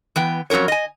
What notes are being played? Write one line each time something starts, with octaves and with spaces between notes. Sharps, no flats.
E3 B3 G5
F2 F#3 C#4 A#4 C#5
D#5 G#5